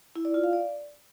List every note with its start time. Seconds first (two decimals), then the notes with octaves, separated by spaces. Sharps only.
0.16 E4
0.25 D5
0.34 F4
0.44 F5
0.53 D5